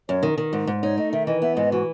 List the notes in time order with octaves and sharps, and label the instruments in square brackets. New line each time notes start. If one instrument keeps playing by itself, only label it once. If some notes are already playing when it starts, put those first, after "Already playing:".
[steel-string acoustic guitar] F#2 [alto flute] C#5
[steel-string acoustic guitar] D#3
D#3
G#2
G#2
[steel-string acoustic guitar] D#4 [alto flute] C#5
[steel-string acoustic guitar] A3 [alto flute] D#5
[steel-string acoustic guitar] D#3 [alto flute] E5
[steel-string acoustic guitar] E3 [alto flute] D#5
[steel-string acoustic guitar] B3 [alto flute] E5
[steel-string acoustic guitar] G#2 [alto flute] D#5
[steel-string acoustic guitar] E3 [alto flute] F#4